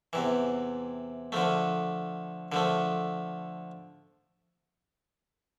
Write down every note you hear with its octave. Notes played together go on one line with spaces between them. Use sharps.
E2 C3 E3
D3 F3 A3
D3 F3 A3